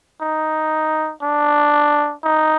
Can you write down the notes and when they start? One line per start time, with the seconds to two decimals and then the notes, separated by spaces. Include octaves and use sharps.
0.21 D#4
1.22 D4
2.24 D#4